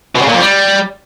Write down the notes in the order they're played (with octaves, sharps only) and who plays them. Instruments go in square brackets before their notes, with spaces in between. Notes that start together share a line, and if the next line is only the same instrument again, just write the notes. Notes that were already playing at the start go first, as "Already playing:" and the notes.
[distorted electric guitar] B2
C#3
A#2
F2
G3